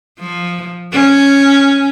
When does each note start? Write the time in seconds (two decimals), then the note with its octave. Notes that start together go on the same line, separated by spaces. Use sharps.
0.20 F3
0.92 C#4